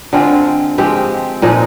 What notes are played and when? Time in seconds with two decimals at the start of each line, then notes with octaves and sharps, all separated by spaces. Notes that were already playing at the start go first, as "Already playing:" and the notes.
0.13 D3 G#3 C4 F4
0.78 F3 G#3 C4 G4
1.42 A#2 F3 G#3 D#4